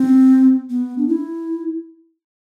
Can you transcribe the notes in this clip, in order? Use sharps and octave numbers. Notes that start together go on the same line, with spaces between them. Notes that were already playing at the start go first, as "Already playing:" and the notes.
Already playing: C4
B3
D4
E4